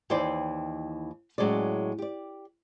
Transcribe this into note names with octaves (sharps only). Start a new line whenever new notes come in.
D#2 E3 D#4 C5 D5 G5
A2 F#3 G#3 C#4 D5
G4 D5